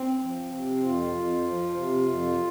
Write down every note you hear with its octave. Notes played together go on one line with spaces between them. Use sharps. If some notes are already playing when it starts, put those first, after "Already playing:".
Already playing: C4
F3
C3
F2 F4
F2
F3
C3
F2